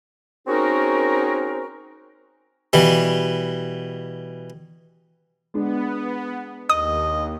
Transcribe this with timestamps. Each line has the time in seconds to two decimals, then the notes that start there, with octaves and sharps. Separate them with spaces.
0.47 C4 C#4 D#4 F#4 G#4 A#4
2.73 B2 E3 G3
5.54 G#3 B3 D4
6.69 D#2 D#5 D#6